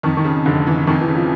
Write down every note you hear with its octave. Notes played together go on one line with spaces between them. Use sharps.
F2 D#3
D#3
C#3
F1 D3
E3
F2 D#3
E3
C#3
F3